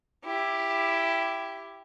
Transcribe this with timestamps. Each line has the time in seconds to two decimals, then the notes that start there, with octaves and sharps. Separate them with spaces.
0.25 E4 G4